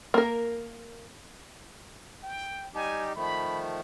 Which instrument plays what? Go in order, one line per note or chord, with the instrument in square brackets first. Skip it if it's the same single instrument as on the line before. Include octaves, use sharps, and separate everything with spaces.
[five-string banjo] A#3 A#4
[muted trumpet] G5
[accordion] G3 D#4 G4 [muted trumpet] G#5
[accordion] D#3 F3 A3 [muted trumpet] B5